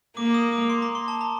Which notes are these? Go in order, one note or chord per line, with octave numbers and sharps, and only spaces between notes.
A#3 D6
D#6
D6
C6
A#5
C6
A5
A#5